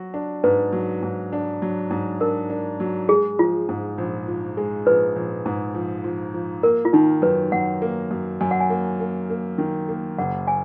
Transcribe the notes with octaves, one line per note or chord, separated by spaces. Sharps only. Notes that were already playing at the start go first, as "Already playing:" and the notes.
Already playing: F#3 F#4
D4
G#2 B4
F#3
G#2
D4
F#3
G#2
D4 A#4
D4
F#3
G#3 G#4
F3 F4
G#2
A#1
F3
G#3
A#1 B4
A#1
G#2
F3
F3
F3
A#3 A#4
F4
D#3 D#4
F#2 B4
F#2 F#5
A#3
F#2
F#2 G#5
F#5
G#5
A#3
A#3
A#3
D#3
A#3
F#1 F#5
G#5